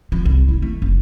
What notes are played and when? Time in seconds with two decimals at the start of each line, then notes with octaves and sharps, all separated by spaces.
0.12 F3
0.25 C2
0.49 E4
0.62 A3
0.82 F#1